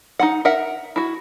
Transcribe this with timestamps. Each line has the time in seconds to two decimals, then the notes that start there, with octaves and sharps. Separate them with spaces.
0.19 D#4 F4 F#5
0.45 A#4 E5 F#5
0.96 E4 F#4